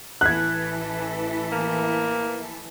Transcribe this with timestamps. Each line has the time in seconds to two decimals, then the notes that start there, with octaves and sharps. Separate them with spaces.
0.21 A1 E3 A4 F#6 G#6
1.52 A#3